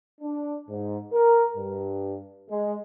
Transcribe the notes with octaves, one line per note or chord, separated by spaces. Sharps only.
D4
G#2
A#4
G2
G#3